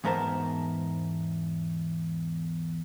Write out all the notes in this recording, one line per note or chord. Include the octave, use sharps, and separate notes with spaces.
E2 G#2 B3 A#4 C5 A5